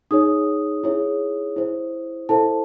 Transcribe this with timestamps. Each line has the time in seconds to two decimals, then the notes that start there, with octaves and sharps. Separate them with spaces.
0.11 D#4 G#4 C#5 D#6
0.84 E4 G#4 C#5
1.56 E4 C5
2.29 E4 A4 C5 A5